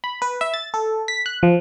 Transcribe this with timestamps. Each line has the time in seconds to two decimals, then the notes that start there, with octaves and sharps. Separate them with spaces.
0.04 B5
0.22 B4
0.41 E5
0.54 A6
0.74 A4
1.08 B6
1.26 F#6
1.43 F3